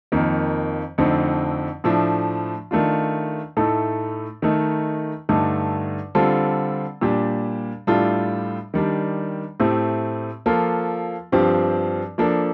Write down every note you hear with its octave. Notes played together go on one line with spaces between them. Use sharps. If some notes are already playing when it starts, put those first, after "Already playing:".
F2 D#3 A#3
F2 D3 A3 C4 D#4
A2 F3 A3 D4
D#3 A3 D4 F4
A2 A3 D#4 A4
D#3 A3 D#4
G2 D3 A3 D#4
D3 G3 C4 F4 A4
A#2 G3 D4 G4
A2 G3 D4 F4 A4
D#3 G3 D4
A2 A3 C4 G4
F3 A#3 F4 A4
G2 F3 C4 G4
F3 A#3 D4 A4